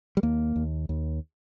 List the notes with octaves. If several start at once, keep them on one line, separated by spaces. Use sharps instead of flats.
G3
D#2 A#3
D#2
D#2